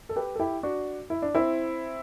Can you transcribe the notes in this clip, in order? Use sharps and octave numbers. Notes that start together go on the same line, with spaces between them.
A4
G4 B4
A4
E4 G4
D4 F#4
E4
D4
C4 E4